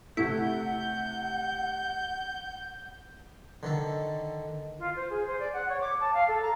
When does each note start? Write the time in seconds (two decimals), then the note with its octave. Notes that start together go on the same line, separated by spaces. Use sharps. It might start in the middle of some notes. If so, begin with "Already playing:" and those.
0.17 C3 A3 E4 F#5 G6
3.63 D3 D#3 A4
4.79 F4
4.96 C5
5.10 G#4
5.27 C5
5.39 D5
5.53 F#5
5.69 C#5
5.81 D6
6.00 A5
6.14 F5
6.28 A4
6.42 A#5